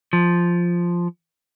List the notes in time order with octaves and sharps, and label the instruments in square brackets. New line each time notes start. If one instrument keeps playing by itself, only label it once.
[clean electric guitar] F3